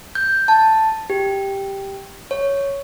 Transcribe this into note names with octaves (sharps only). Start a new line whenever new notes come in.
G6
A5
G4
C#5